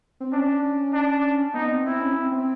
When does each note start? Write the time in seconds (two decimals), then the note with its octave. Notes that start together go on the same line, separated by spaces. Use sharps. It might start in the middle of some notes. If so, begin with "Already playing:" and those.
0.20 C4
0.32 C#4 D4
0.94 D4
1.54 B3 D#4
1.70 C4
1.85 C4 E4
2.00 C#4
2.16 C4
2.32 C4